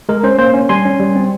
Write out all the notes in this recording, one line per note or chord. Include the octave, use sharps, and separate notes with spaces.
G#3 A#4
C#4 C5
A#3 C5
C#4
G3 G#5 C6
C#4
G3
C4